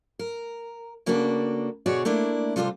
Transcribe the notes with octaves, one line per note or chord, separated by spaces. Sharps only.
A#4
C#3 A#3 D4 F#4 A4 B4
D2 B2 F#4 G#4 C#5 D5
A3 A#3 D4 E4
C3 G3 F4 A4 B4 C5